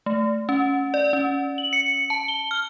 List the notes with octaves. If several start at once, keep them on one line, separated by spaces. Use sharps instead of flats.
A3
C#4
D5
C#4
F#7
C#7
A5
G7
F6